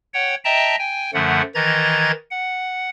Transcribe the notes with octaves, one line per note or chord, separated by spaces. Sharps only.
C#5 F#5 G5
D#5 E5 G5 A5 A#5
G5 G#5
F#2 D3 F3 A3 F#5
D#3 E3 D#5 A#5 G#6 A6
F#5